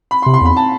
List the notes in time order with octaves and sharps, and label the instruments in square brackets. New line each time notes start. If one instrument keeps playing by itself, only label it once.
[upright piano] B5
C6
[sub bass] C3
[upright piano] C6
[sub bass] E2 [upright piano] B5
[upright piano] A5